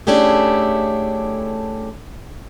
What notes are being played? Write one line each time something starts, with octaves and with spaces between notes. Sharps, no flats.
A3 C#4 D4 E4 G4 G#4